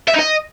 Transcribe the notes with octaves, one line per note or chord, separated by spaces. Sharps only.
E5
D#4
D#5